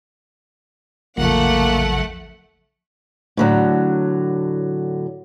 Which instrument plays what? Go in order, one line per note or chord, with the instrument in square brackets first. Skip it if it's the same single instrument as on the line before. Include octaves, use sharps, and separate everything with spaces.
[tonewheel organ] A1 F#3 [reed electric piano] E2 C#3 F3 [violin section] A3 F#5 [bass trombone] A#3
[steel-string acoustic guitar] A2 D3 F#3